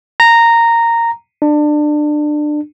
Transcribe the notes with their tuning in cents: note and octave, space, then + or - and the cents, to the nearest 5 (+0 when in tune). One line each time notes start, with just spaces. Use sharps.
A#5 -10
D4 +25